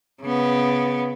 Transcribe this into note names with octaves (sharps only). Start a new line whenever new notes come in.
C#3 B3